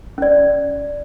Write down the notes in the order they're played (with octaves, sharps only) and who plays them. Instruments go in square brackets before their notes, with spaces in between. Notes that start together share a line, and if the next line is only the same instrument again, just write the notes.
[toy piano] C#4 D5